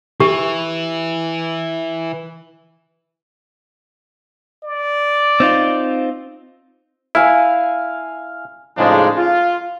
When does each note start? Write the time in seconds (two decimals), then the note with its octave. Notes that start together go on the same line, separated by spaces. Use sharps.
0.20 E3 G4
4.63 D5
5.40 C4 D#4 F4
7.15 E4 F5 G#5
8.77 A2 C#3 F3 G#3 D4 D#4
9.16 F4